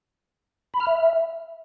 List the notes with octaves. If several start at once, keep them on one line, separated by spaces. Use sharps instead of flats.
B5
F6
E5